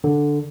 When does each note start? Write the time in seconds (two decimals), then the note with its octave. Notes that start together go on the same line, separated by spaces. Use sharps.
0.04 D3